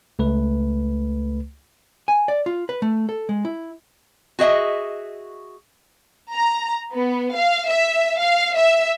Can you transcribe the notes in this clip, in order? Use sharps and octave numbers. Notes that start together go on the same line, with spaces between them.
C#2 A3 B4
G#5
D5
F4
B4
A3
A4
G#3
E4
F#4 G#4 D#5 E5
A#5
B3
F5
E5
F5
E5